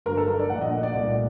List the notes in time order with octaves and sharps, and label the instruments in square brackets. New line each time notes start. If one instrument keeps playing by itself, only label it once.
[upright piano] G1 G2 F#3 A#4
A4
A#4
D5
A#1 A#2 A3 F#5
D#5
F#5
D5
C2 A#2 A3 D5